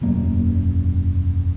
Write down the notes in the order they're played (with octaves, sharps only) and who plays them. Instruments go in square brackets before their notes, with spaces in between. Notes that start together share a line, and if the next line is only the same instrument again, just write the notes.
[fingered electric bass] E1 F#2 A#3